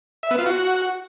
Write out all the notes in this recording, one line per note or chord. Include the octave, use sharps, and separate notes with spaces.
E5
B3
F4
F#4